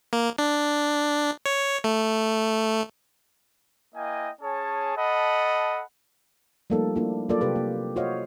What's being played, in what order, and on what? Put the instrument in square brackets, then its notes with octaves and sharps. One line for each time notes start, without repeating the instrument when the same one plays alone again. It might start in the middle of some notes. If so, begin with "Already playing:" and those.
[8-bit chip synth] A#3
D4
C#5
A3
[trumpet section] A#3 E4 D#5 G5 G#5
C#4 G#4 C#5 A5
A4 D#5 F#5 A5 B5
[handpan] F3 G3 A3 A#3 D#4 A4
A#3 D4 E4 F4
F#3 A#3 F4 A4 A#4 D5
C3 G4 A4 B4
A#3
F4 F#4 C5 C#5 D#5 F5